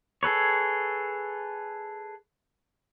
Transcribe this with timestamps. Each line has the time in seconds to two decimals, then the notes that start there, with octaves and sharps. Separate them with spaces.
0.23 G#4 A4 B4 C#5